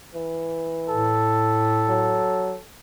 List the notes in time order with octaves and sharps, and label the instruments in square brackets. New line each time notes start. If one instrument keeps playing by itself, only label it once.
[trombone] E3
[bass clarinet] A2 [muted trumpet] A4
[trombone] F#3